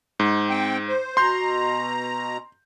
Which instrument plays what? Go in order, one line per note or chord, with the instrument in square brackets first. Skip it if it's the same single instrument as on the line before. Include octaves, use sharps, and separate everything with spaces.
[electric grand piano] G#2
[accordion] C4 G5
C5
[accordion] B2 A#5 [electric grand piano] C6 G6